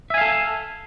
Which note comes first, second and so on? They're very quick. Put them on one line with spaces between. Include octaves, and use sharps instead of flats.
E5 G#5 F5 A4